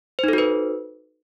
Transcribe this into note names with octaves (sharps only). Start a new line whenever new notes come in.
D#4 F#4 A4 B4 C5